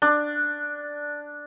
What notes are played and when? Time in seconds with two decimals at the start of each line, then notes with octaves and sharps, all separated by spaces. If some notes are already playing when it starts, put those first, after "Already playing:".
0.02 D4